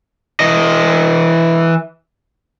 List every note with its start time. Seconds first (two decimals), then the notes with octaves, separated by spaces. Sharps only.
0.40 E3 D#5